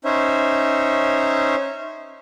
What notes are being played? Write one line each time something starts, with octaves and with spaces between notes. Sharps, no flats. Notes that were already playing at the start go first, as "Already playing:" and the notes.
C#4 D#4 C5 C#5 E5